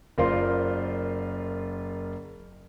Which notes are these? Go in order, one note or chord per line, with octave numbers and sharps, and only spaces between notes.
F#1 F4 A#4 C5 D5 C6